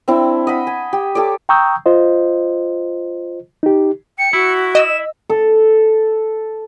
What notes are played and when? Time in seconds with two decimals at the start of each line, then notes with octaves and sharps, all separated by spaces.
0.08 C4 D4 E4
0.47 D#5 F#5 B5
0.67 G#5
0.93 G4
1.15 G4 A4 C#5 D5
1.49 G5 A#5 C#6 D#6 E6 G6
1.86 F4 C5 D#5
3.63 D#4 G4
4.19 G5 C#7
4.33 E4 F#4
4.75 D#5 E6 E7
5.30 A4